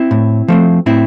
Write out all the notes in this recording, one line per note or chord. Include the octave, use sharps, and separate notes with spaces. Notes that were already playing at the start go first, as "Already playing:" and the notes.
Already playing: C4 E4
A2
F3 A3 C4
A2 C4 E4